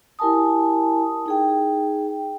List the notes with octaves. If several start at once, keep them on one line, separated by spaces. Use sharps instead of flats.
E4 G4 A#4 G#5 A5 D#6
D#4 G#4 G5